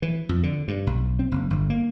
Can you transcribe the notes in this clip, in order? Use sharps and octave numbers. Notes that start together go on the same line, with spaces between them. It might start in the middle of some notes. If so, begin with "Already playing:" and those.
E3
F2
D3
G2
B1
C4
F#1
G1
A#3